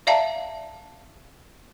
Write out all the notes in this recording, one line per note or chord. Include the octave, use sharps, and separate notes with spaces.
D5 E5 F5 A5 A#5